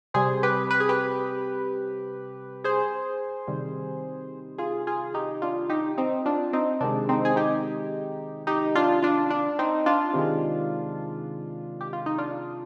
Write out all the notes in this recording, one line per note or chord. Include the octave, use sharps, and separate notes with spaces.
C3 G3 G#4 C5
G4 B4
B4
G#4
G4 B4
G#4 C5
C3 D#3 G3
F4 G#4
F4 G#4
D#4 G4
D4 F4
D#4 G4
C4 D#4
D4 F4
C4 D#4
C3 D#3 G#3 D4
C4 D#4
G#4
D#4 G4
D#4 G4
D4 F4
D4 F4
D4
C4 D#4
D4 F4
C3 D#3 G#3
G4
F4
D#4
D4 F4